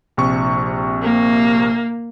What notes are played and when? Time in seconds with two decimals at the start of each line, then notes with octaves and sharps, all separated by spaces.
0.17 A#1 C3 C#6
1.03 A#3